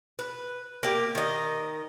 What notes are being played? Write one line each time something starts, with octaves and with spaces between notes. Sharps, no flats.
B4
A#3 G4
D#3 D#5